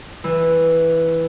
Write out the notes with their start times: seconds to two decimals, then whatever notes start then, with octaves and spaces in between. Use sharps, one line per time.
0.24 E3